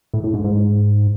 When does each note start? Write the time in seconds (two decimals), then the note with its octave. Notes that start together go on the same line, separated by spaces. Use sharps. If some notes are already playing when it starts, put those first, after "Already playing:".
0.14 A2
0.24 A2
0.34 G#2
0.44 G#2